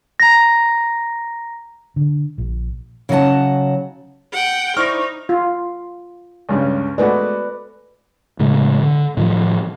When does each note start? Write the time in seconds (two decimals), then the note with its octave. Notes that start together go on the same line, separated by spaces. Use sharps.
0.20 A#5 A#6
1.96 D3
2.38 A#1
3.09 C#3 F#3 D#4 D#5 F#5 A5
4.32 F#5 G5
4.77 D#4 E4 C5 D5 C#6 F6 A#6
5.29 F4
6.49 C#2 G2 C#3
6.98 G#3 A3 F#4 B4 D5
8.39 A2 C#3 G#3
8.82 D3
9.17 A2 D#3 F3